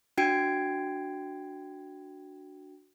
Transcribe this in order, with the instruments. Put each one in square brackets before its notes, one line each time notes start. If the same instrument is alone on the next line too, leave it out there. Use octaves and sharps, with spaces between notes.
[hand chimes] D4 F#4 G5 G#6 C7 D7